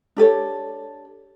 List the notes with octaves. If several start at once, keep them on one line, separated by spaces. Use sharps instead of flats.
D4 G4 A4 C#5